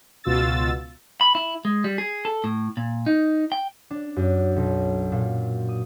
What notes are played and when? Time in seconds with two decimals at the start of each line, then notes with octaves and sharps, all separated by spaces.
0.24 C#2 B2 F4 F#4 E6 A6
1.21 B5
1.35 E4
1.65 G#3
1.84 G3
1.98 G#4
2.25 A4
2.44 A2
2.77 A#2
3.06 D#4
3.52 G5
3.90 D4
4.16 F#2
4.56 B1
5.12 A#2
5.69 D#6